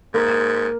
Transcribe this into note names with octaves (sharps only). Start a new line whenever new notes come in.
G#2 A#3